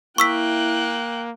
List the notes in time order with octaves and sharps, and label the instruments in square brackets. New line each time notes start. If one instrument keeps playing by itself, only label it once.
[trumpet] A#3 [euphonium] E4 [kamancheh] G5 F#6 [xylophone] C#6 E6 B6